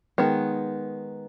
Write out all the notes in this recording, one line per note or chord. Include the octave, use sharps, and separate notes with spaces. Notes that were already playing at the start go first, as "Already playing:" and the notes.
D#3 G#3 B3